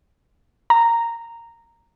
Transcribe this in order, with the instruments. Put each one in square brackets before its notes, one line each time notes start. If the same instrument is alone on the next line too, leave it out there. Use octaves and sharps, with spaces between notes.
[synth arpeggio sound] A#5